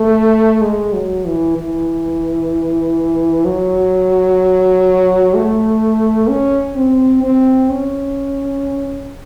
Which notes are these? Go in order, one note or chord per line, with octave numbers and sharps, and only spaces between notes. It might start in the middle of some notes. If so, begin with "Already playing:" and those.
Already playing: A3
G#3
F#3
E3
E3
F#3
A3
C#4
C4
C4
C#4